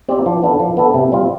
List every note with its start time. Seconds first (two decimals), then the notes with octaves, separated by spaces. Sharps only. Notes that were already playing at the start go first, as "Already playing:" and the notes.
0.09 C4 G4 D5
0.26 F3
0.42 B3 D4 A4
0.60 F3
0.77 B3 D4 A4
0.94 C3
1.12 G3 C4 F4